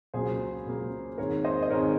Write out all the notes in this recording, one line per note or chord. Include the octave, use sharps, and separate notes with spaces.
C#2 C#3 F#3 A#3 G#4 C5
C#2 C#3 F#3 A#3
G#2 D#3 G#3 C4 A#4 C#5
C5 D#5
D#5
G#2 D#3 G#3 C4 A#4 C#5